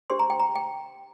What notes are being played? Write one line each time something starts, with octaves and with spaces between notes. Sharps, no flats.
D4 G4 C5 C6
A#5
G5
A#5
G5